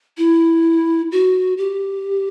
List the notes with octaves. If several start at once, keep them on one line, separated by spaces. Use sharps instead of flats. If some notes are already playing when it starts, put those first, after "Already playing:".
E4
F#4
G4